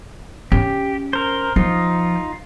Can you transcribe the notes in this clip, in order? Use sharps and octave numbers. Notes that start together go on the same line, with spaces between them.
C#4 G4
A#4 C5
F3 D#4 F4